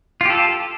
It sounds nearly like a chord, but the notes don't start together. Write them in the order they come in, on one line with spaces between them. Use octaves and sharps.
F4 G4 A4